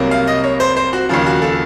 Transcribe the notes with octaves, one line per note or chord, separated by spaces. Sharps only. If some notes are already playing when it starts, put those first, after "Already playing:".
Already playing: C2 C3 F#3 A#3
F5
D#5
C#5
C5
C5
F#4
D#2 C#3 F3 F4
F#4
A4